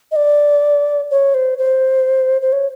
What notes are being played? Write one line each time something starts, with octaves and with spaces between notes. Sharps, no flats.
D#5
D5
C#5
C5
C5
C5
C#5